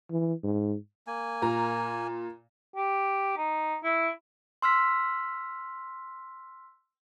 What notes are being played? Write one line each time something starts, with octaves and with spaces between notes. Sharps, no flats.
E3
G#2
A#3 G#5
A#2 A#5
G4
D#4
E4
C6 E6 F6 B6